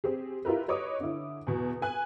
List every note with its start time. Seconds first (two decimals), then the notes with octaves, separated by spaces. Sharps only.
0.04 C4 G4 G#4
0.45 E4 F4 G4 A#4 B4
0.68 B4 C#5 D#5 D6 D#6
1.00 D3 E4
1.47 E2 B2
1.82 B4 G#5 F#6